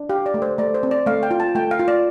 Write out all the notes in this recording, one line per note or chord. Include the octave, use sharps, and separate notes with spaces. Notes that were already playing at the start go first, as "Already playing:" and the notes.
Already playing: D4
G4 F5
D5
A3
C5
A3 D5
C5
C4
D5
A3 F5
G5
F4
A5
A3 G5
F5
F4
D5